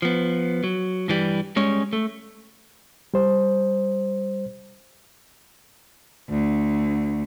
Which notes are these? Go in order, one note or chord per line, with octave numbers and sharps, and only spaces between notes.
F3 B3
F#3
G2 E3 G3
G3 G#3 C#4 C#5
A3
G3 C5
D2